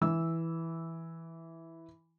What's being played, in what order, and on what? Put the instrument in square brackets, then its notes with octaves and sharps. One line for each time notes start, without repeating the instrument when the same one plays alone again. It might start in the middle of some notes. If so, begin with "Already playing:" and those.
[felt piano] E3 E6